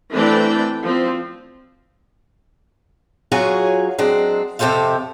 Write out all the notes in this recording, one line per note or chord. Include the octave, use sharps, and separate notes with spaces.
E3 A3 C4 D4 D5 G5
F3 C4
F#3 F4 F#4 G#4 C#5 G#5
F#3 G#3 C4 D4
F2 C3 G4 A4 C5 F5